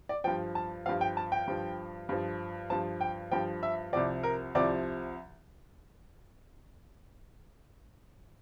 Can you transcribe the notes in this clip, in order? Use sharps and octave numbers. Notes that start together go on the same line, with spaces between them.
D5
G2 F3 G5
A5
G2 F3 F5
G5
A5
G5
G2 F3
G2 F3
G2 F3 A5
G5
G2 F3 G5
E5
C2 C3 F3 D5
A#4
C2 C3 F3 D5